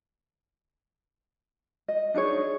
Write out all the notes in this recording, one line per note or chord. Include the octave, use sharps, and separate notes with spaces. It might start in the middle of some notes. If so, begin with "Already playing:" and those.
D#5
D4 D#4 G#4 C#5